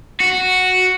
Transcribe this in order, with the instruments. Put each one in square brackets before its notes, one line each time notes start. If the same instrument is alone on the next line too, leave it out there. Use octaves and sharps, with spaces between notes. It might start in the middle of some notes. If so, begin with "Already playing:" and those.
[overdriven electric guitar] F#4